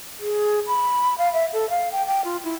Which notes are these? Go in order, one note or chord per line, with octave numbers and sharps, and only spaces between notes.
G#4
B5
F5
E5
A4
F5
G5
G5
F4
E4